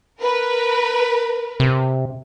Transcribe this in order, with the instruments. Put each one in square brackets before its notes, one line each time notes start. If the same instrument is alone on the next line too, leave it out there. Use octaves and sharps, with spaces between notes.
[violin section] A#4 B4
[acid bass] C3